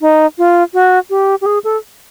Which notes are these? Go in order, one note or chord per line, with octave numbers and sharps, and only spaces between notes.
D#4
F4
F#4
G4
G4
G#4
A4